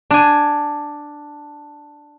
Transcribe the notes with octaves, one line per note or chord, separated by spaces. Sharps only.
D4 G#5